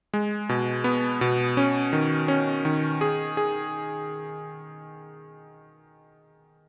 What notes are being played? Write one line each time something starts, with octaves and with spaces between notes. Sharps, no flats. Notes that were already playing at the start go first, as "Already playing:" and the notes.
G#3
B2
B3
B2
C#4
D#3
C#4
D#3
G#4
G#4